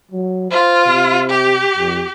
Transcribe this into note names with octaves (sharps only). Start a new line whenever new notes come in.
F#3
F4 C5
C3
G4
F2